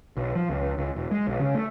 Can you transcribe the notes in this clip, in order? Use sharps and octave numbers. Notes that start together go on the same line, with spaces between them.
B1
F3
C#2
C#2
E1
G#3
B1
C#3
A3